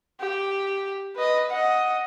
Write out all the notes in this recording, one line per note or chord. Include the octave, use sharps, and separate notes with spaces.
G4
B4 D#5
D#5 F#5